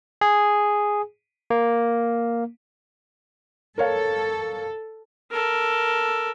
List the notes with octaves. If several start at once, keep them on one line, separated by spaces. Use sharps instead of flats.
G#4
A#3
A4 A#4 C#5 F5
A4 A#4